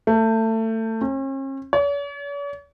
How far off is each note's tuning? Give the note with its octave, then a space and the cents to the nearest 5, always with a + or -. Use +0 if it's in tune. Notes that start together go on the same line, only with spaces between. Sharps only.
A3 +25
C#4 -45
C#5 +45